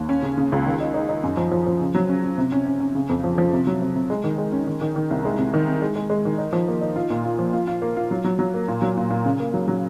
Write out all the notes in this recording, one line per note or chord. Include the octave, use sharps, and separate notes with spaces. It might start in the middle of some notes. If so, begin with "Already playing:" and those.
Already playing: D#2
C#4
C#3
C#3
C#2
D#3
D#4
D#4
D#4
F#2
F3
F3
F3
C#3
F#3
C#4
C#4
C3
C#4
C#4
C#4
C#3
F2
F3
F3
C3
F#3
C3
C3
G#3
D#3
G#3
C#4
D#3
D#3
D#3
C2
G#3
C3
D#3
C3
G#3
G#3
G#3
D#3
D#4
F3
A#3
D#4
F4
A#2
F4
F3
F4
F4
A#3
F4
F#3
F#3
F#3
A#3
A#2
F#3
A#2
A#2
C#3
A#3
F#3
F#3